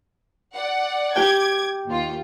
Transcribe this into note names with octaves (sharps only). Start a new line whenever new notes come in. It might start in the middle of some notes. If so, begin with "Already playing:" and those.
D5 F#5
G4 G5 D6 G#6
D#2 F4